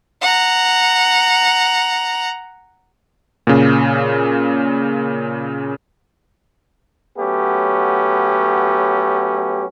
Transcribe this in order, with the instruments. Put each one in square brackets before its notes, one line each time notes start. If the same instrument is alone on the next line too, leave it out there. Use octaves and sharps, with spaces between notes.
[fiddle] F#5 A#5
[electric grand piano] A#2 C#3
[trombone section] F#3 A3 B3 C#4 G4